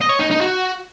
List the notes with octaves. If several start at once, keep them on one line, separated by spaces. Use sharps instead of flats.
D#5
C#5
D#4
D#4
F#4